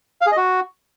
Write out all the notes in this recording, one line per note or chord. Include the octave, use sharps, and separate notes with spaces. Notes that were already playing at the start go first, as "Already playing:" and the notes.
F5
G#4
D#5
F#4